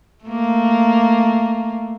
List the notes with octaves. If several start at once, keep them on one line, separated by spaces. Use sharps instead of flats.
A3 A#3